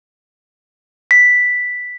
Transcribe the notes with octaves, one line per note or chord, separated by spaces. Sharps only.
B6